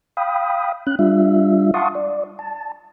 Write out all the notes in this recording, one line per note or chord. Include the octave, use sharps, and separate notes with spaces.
F5 G5 B5 D#6
C#4 F#6
G3 D4 F4 E5
F5 F#5 A5 C6 C#6 D#6
D5
A5